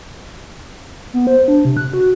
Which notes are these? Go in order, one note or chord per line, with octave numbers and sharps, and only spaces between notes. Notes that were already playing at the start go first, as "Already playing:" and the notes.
B3
C5
D4
C3
F#6
F#4